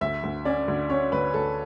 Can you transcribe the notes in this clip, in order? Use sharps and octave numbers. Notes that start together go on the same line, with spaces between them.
D2 E5
D2
C#4 D5
D2
C#4 C#5
D2 B4
D2 A4